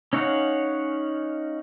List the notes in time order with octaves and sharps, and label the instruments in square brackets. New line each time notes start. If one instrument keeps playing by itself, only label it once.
[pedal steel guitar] C#4 D#4 C#5 F5 F#5